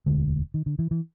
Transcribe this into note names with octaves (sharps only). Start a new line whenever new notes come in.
E1 D2 D3 G#3
D#3
D3
E3
E3